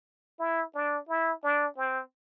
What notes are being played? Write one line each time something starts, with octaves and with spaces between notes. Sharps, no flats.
E4
D4
E4
D4
C4